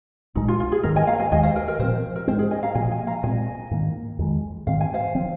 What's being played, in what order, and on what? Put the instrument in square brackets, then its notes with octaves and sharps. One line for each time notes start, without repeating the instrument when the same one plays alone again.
[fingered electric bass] C2 A#2 G#3 [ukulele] D#4
[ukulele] F4
F4
G#4
[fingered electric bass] G#2 D#3 A#3 [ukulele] A#4
[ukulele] D#5 G#5
F5 A#5
D#5 G#5
[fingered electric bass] D#2 D#3 G#3 [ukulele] D#5 G#5
[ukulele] C5 F5
A#4 D#5
A#4 D#5
[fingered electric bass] A#2 F3 C4 [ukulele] C5
[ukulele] A#4
[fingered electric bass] G#2 G#3 C4 [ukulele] C5
[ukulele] G#4
D#5 G#5
F5 A#5
[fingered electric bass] A#2 F3 A#3 [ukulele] D#5 G#5
[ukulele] D#5 G#5
F5 A#5
[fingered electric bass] A#2 G#3 C4 [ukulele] D#5 G#5
[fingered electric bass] G#2 D#3 A#3
F2 D#3 G#3
[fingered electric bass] G#2 D#3 C4 [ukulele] F5
[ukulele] G#5
C5 F5
[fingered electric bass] F3 C4